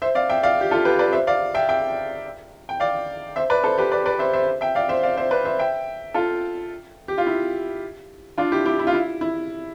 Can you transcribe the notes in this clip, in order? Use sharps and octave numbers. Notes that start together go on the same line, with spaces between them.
C5 E5
D5 F5
E5 G5
D5 F5
G4
F4 A4
G4 B4
B4 D5
C5 E5
D5 F5
E5 G5
E5 G5
G5
D5 F5
C5 E5
B4 D5
A4 C5
G4 B4
B4 D5
B4 D5
C5 E5
C5 E5
E5 G5
D5 F5
C5 E5
D5 F5
C5 E5
B4 D5
C5 E5
E5 G5
F4 A4
G4
F4
E4
D4 F4
E4 G4
E4 G4
E4
F4
E4
E4